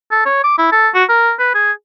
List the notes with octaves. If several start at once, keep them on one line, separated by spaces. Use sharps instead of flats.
A4
C#5
D6
E4
A4
F#4
A#4
B4
G#4